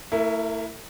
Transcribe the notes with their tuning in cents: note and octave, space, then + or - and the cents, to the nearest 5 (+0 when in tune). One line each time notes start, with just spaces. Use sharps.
A3 +40 E4 +0 A#4 +0